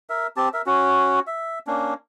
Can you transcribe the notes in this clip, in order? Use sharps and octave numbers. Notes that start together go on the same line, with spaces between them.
A#4 E5
C4 G4 A5
A#4 E5
C#4 F#4
E5
A#3 C#4 D4